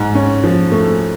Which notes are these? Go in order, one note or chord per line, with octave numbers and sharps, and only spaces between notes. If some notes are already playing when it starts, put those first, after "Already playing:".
Already playing: G#2
C#4
F3
A3